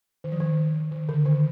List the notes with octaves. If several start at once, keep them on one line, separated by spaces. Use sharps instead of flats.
D#3
F3
D#3
D#3
D3
D#3